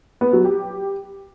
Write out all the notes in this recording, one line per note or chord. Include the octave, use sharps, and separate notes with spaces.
B3
F#3
G4